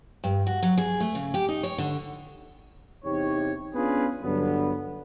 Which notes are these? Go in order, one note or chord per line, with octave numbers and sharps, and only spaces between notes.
G2
F#4
F#3
G#4
A3
C#3
G4
D#4
C#5
D3
E2 C3 D#4 G4 C#5
B3 C#4 D4 F4 G#4 B4
G2 D3 F#3 B3